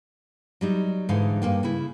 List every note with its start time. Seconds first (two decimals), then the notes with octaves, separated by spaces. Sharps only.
0.61 F#3 G3 D#4
1.09 G#2 D3 E3 D#4 F5
1.42 G2 A#3 G5
1.63 C#3 E4